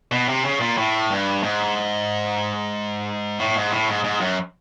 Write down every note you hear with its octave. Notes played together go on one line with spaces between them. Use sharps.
B2
C3
C#3
A#2
A2
G2
G#2
A2
G#2
A2
G#2
G#2
F#2